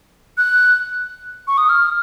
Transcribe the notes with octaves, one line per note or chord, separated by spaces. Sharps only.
F#6
C#6
D#6
F6